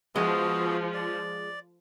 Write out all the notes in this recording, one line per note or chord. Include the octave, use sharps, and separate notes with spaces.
F3 G#3 B3 F#4 G#4
D5